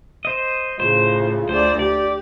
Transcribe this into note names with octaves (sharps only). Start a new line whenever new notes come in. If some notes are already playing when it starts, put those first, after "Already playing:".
C5 D#5
A2 C#3 F4 C5
D2 C5 D5
G4 D5